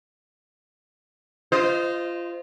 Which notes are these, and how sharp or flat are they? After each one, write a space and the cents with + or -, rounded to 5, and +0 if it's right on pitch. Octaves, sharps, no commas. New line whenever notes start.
F4 -20 C5 -20 D#5 +0